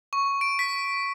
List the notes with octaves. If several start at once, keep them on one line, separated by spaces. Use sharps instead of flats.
C#6
D7
B6